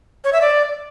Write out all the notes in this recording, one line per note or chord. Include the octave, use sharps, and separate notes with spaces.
C#5
E5
D5